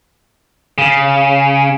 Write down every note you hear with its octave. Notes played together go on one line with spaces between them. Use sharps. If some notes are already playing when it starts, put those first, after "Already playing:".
C#3